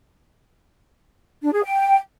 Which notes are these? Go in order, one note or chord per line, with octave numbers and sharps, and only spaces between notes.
D4
G#4
G5